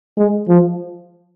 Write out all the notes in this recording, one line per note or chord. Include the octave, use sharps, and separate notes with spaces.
G#3
F3